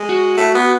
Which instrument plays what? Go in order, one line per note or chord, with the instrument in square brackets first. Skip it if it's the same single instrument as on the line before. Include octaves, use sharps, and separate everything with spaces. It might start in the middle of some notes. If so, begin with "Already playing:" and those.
Already playing: [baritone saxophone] G#3
[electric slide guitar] F#4
[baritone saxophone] A3
B3